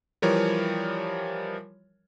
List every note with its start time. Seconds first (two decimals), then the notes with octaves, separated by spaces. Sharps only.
0.22 E3 F3 G3 A#4 C#5